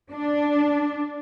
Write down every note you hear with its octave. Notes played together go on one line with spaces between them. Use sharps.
D4